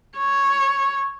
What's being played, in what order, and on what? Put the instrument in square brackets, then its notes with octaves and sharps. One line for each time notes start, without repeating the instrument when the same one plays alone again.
[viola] C#5